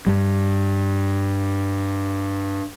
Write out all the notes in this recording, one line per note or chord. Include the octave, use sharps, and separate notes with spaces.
G2 G3